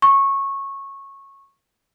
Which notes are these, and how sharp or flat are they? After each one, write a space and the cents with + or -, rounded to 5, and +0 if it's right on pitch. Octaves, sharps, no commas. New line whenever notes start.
C#6 -15